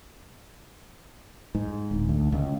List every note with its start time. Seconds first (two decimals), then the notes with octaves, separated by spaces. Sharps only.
1.55 G#2
1.91 D1
2.09 D2
2.32 C#2